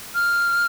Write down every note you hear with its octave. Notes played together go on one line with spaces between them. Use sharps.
F6